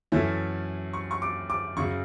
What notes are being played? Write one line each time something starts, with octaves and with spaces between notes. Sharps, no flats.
F#2 E3 A3 C#4 E5
C#6
C#6
D6
D6
F#2 C#3 F#3 C#6